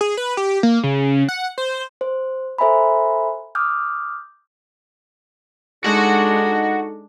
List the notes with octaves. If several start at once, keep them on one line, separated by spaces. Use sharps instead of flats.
G#4
B4
G4
A#3
C#3
F#5
C5
C5
A4 C5 E5 G#5 A#5 B5
D6 D#6 F6 G6
G#3 D4 D#4 F#4 A4 F#5